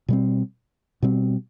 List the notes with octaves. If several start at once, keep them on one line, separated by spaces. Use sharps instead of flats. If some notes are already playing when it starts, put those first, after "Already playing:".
B2 G3 C4
B2 G3 C4